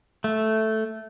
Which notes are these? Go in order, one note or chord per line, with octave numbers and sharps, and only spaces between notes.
A3